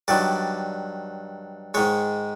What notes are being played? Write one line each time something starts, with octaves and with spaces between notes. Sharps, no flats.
G2 D#3 F#3 D5
G#2 D#3 G#3 C#5